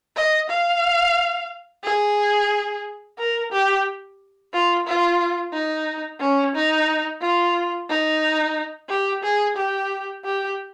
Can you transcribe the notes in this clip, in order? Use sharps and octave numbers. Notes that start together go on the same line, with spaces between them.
D#5
F5
G#4
A#4
G4
F4
F4
D#4
C#4
D#4
F4
D#4
G4
G#4
G4
G4